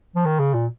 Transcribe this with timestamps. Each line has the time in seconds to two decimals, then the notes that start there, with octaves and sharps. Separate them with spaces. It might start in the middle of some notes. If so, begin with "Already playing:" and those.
0.16 F3
0.25 D#3
0.39 C#3
0.54 A#2